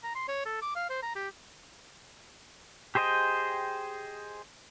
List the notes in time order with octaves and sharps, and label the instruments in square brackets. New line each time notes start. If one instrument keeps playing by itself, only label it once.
[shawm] A#5
C6
C#5
A4
D6
F5
C5
A#5
G4
[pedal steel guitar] G4 G#4 C5 D#5 G5